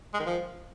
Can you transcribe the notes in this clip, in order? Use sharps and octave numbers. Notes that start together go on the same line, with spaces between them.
G#3
D#3
F3